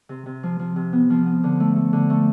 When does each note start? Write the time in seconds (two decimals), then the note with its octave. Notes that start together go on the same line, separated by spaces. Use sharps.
0.09 C3
0.26 C3
0.43 F3
0.59 F3
0.76 C3
0.93 B3
1.10 F3
1.26 B3
1.43 D3
1.60 A3
1.76 A3
1.93 D3
2.10 A3